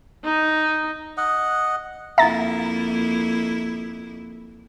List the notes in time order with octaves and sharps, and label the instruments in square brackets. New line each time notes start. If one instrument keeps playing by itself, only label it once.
[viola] D#4
[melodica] D#5 F#5
[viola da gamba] F2 A#3 E4 [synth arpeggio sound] E5 A#5 A6